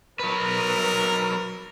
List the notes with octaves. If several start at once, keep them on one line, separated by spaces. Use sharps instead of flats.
F#3 A#4 B4